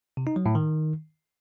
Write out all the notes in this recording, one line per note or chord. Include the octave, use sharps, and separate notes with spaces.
C3
D#4
F#3
A2
D#3